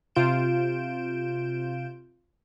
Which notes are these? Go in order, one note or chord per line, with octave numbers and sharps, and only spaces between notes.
C3 F4 G6 D7 E7